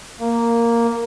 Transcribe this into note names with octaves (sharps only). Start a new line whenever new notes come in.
A#3